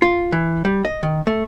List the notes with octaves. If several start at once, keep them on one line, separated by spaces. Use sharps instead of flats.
F4
E3
G3
D#5
D#3
A3